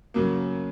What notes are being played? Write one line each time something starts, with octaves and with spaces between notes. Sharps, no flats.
F#2 C#3 F#3 A#3